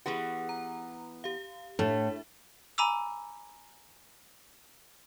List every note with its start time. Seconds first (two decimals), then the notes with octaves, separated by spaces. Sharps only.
0.06 E3 B3 G4 G#4 F#5
0.49 A#5
1.24 G4 F5
1.79 A2 A3 D4 E5
2.78 G#5 A#5 B5 D6 E6